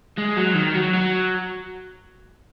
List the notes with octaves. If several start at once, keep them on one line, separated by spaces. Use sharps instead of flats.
G#3
F#3
D#3
F#3
F#3